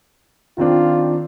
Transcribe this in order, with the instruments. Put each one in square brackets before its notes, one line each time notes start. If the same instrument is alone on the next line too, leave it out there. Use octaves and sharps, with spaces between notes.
[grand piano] D#3 C4 D4 [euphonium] F4